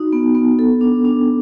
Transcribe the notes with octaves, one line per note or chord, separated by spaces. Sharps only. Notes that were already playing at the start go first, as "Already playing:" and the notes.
Already playing: D#4 F#4
B3
B3
A4
D4
D4